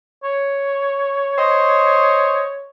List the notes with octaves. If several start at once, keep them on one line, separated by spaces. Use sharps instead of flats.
C#5
C5 D#5